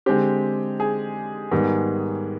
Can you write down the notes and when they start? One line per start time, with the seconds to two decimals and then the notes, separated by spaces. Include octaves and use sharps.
0.06 D3 G#3 C4 G4
0.80 G#4
1.51 G#2 D#3 G3 B3